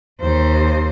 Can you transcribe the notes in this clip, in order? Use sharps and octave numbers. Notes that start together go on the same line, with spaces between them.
D#2 C5